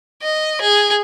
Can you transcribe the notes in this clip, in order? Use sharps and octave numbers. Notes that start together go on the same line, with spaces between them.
D#5
G#4